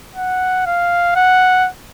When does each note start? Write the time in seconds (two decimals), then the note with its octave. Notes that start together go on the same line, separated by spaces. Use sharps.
0.15 F#5
0.66 F5
1.16 F#5